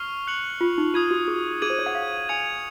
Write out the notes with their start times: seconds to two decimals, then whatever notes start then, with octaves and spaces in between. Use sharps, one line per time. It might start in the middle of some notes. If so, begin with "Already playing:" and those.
Already playing: C#6 F6 C7 F7
0.27 F#6 C#7 F#7
0.61 F4
0.78 D#4
0.94 F4 D#6 G#6 D#7
1.11 F#4
1.28 G#4
1.62 G#4 G#6 D#7 F#7
1.70 C5
1.79 C#5
1.86 F#5
1.95 F5
2.29 G#5 G#6 C#7 F7